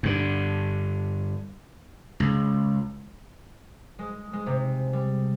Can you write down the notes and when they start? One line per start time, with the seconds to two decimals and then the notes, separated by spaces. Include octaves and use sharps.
0.03 G2 D3
2.20 C#2
3.99 G#3
4.33 G#3
4.46 C3
4.93 G3